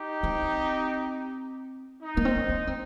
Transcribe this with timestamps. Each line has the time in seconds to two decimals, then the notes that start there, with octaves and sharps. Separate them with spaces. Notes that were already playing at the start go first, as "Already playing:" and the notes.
Already playing: D#4 G4
0.23 C4
2.02 D#4
2.17 A#3
2.25 C4
2.49 C#4
2.67 C4